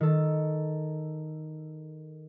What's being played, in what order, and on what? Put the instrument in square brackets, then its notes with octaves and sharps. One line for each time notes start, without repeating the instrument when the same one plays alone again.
[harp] D#3 A4